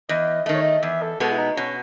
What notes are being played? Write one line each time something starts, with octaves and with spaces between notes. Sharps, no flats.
E2 D#5
D#3 A3 D#5
C#5
D#5
E2 E5
A4
B2 G#3 B3 A4
E4
D#4
B2 C#4